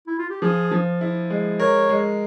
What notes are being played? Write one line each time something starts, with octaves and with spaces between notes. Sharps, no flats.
E4
F4
G4
F3 G#4
F3
E4
G#3
A#4 C#5
G#3